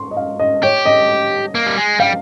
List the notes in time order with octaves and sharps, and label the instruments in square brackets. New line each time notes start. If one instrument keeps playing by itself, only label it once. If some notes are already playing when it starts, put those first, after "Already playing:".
Already playing: [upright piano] C6 C#6
D#5
F5
D#5
[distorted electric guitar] G4 [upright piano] C#5
[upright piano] D#5
[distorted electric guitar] A#3
G3
G#3
[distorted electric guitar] G3 [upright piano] F5